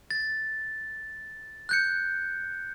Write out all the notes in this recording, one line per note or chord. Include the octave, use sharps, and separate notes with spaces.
A6
F#6 G6 C#7